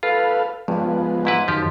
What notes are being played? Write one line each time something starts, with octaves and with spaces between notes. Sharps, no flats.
F4 A4 B4 F5
G2 F3 G#3 B3
G#2 E4 B4
F#2 D#3 F3 G4